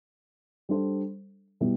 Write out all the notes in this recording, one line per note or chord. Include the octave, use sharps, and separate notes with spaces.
G3 D4 A4 C5
B2 G3 B3 E4 G4